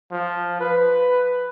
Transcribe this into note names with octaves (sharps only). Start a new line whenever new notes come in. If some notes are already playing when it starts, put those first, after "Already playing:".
F3
B4